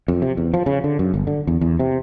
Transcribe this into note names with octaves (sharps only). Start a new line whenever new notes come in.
F2
C3
E2
F3
C#3
D3
F#2
G1
D3
E2
E2
C3